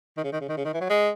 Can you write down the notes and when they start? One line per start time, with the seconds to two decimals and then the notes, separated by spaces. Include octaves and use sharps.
0.17 D#3
0.24 C#3
0.32 D#3
0.41 C#3
0.49 D#3
0.57 C#3
0.65 D#3
0.74 E3
0.81 F#3
0.90 G#3